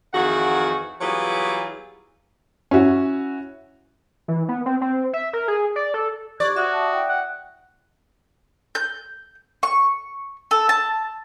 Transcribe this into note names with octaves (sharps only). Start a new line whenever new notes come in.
F2 D#3 E3 F#4 G#4 F#5
E3 F#3 G3 B3 F4 G#4
C#4 E4 F#4
E3
B3
C4
C4
E5
A#4
G#4
D5
A4
G4 C5 D5 C#6 F#6 G#6
F#4 E5 D#6
A5
E4 G5
F#5
G6
C#6
A4
A5